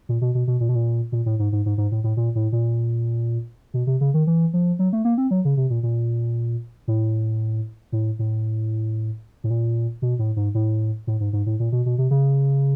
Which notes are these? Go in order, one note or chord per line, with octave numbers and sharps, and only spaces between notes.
A#2
B2
B2
B2
A#2
B2
A#2
A#2
A2
G#2
G#2
G#2
G#2
A2
A2
A#2
A2
A#2
B2
C3
C#3
D#3
E3
F3
F#3
A3
A#3
C4
F#3
C#3
C3
A#2
A#2
A2
A2
A2
A2
A#2
B2
A2
G#2
A2
A2
G#2
G#2
A2
A#2
B2
B2
C3
C#3